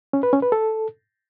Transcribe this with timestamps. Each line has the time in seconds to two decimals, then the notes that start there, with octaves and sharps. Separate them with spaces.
0.13 C#4
0.23 B4
0.33 C#4
0.42 B4
0.52 A4